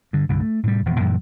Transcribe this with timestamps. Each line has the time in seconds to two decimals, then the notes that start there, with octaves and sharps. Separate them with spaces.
0.13 G2 D3
0.29 C2 G2 D3
0.41 A3
0.63 A2 C3 G3
0.85 D#1 E2 F3
1.00 F#2 A#2 E3 G3